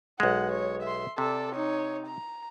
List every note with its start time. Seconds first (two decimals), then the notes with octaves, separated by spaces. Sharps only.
0.20 B1 G#3 F#5
0.52 C#5
0.83 E5 C6
1.18 C3 A4 D5
1.55 D#4 C#5
2.07 A#5